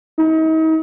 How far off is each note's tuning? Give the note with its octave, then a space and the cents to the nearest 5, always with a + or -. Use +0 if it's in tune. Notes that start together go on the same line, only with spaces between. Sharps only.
D#4 +40